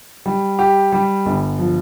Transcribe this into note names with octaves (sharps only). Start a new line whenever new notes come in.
G3
G4
G3
G1
F3